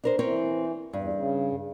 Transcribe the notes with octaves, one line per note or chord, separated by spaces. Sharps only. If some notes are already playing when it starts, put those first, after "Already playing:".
D4 A#4 C5
E3 C4 A#4 C#5
E2 G2
C#3